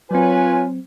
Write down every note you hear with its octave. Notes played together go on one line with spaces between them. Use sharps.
F#3 C4 F4 B4 C#5 G#5